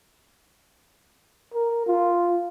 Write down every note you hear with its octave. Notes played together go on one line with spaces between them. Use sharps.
A#4
F4